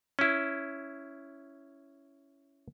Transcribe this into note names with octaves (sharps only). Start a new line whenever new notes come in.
C#4 E4